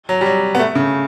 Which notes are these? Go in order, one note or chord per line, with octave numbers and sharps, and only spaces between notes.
F#3
G3
F#3
B3
A3
C#3